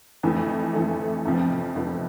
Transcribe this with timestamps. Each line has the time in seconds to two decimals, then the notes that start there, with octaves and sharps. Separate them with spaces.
0.23 F2 E3 A3
0.73 F2 E3 A3
1.25 F2 C3 F3 B3
1.76 F2 C3 F3 B3